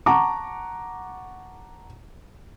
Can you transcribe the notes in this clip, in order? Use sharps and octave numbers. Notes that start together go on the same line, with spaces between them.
F#5 A5 A#5 C#6 D6